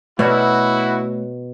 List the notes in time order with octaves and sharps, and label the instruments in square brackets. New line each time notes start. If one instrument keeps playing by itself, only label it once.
[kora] B2 [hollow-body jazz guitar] A3 C#5 D5 [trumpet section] E4 F#4